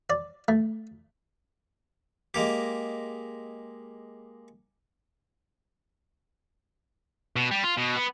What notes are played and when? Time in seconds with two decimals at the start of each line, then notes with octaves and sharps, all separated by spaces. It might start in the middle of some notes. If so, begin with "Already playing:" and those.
0.10 D5
0.48 A3
2.34 G#3 A#3 G4
7.36 B2
7.51 G3
7.64 F4
7.77 B2
7.97 B3